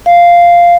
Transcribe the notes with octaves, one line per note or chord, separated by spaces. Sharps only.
F5